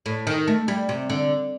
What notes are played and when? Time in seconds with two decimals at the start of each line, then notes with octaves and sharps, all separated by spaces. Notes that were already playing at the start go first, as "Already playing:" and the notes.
0.06 A2
0.27 D#3
0.48 A3
0.68 G3
0.89 C3
1.10 D3